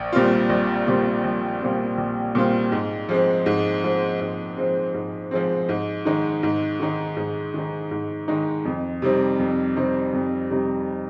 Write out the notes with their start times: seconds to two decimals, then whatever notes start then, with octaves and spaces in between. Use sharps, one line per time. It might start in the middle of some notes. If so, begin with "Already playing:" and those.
Already playing: A#1
0.12 A#2 G3 C4 F4
0.50 A#1
0.87 A#2 G3 C4 F4
1.24 A#1
1.61 A#2 G3 C4 F4
1.98 A#1
2.35 A#2 G3 C4 F4
2.72 G#2
3.09 F3 G#3 C4
3.46 G#2
3.83 F3 G#3 C4
4.20 G#2
4.57 F3 G#3 C4
4.94 G#2
5.31 F3 G#3 C4
5.69 G#2
6.05 D#3 G#3 D#4
6.43 G#2
6.80 D#3 G#3 D#4
7.16 G#2
7.54 D#3 G#3 D#4
7.91 G#2
8.28 D#3 G#3 D#4
8.65 F2
9.02 C3 G3 C4 D#4
9.39 F2
9.76 C3 G3 C4 D#4
10.13 F2
10.50 C3 G3 C4 D#4